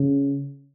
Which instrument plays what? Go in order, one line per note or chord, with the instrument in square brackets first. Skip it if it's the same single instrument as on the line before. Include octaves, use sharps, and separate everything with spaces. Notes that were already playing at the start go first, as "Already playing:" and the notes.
Already playing: [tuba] C#3